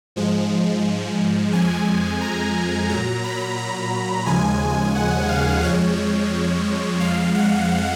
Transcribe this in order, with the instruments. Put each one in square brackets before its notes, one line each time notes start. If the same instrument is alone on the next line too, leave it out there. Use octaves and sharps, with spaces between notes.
[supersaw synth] G#2 F3 G#3
F2 F3 G#3 G#5
A#5
A#2 F#3 A#5
B5
A#5
D#2 C#3 F3 G#3 G#5
F#5
F5
F2 F3 G#3 C#5
F2 F3 G#3 F5
F#5